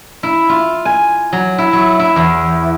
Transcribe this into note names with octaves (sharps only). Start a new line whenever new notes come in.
E4
F4
G#5
F#3
E4
F#3
E4
E2